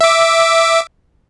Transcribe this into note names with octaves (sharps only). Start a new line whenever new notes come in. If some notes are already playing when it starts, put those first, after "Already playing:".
E5 D6